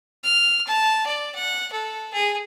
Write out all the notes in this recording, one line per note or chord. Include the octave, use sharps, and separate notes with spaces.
F6
A5
D5
F#5
A4
G#4